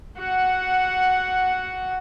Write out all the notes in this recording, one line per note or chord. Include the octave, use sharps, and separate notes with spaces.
F#4 F#5